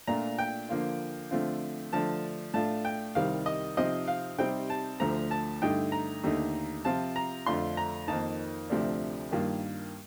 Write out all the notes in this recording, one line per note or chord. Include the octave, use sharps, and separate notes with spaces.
A#2 A3 D4 F4 A#5
G5
D3 F3 A#3 F4
D3 F3 A3 C4 F4
D3 F3 A3 D4 A5
A2 A3 D4 F4 A5
G5
C2 C3 D#3 G3 F5
D#5
C3 F3 C4 D#4 D#5
F5
C3 G3 C4 D#4 G5
A5
D2 D3 F3 A3 A#5
A5
G2 D3 A3 D#4 G5
A#5
D#2 D3 A3 D#4
C3 F3 C4 F4 A5
A#5
F2 D3 A3 D4 F4 C6
A#5
F2 D#3 A#3 D#4 A5
D2 C3 F3 A3 D4
G2 D#3 A#3 F4